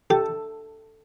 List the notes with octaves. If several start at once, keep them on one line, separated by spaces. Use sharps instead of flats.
G4 A4